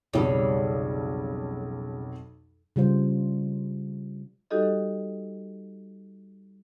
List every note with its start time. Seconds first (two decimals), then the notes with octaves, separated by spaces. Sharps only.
0.13 B1 F2 C#3 G3
2.76 C#3 G3 F4 C5
4.51 G3 D#4 F#4 G4 A4 D#5